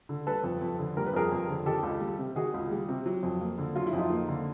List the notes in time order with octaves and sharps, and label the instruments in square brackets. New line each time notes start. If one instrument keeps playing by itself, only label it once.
[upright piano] D3
G3 A4 B4
F2
F2
D3
G3 A#4
B4
F2 G#4 A#4
F2
D3
D#3 G4 A4
C#2
G3
C3
D#3 F#4 G#4
C#2
G3
C3
F#3
F2
A#3
D3
F#3 F4
E4
F2 D#4 F4
A#3
D3